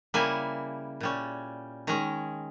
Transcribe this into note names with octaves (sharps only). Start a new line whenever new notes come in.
C#3 G3 A#3 E4 G#5
A#2 G3 C#4
D#3 G#3 C#4 A#5